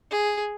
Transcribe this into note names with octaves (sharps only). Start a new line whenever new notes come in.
G#4